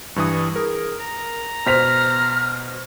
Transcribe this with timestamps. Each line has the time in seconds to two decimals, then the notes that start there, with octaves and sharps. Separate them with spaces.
0.16 G2 E3 C#6 D#6
0.56 G#4 A#4
1.00 A#5
1.66 B2 C5 F6 B6 F7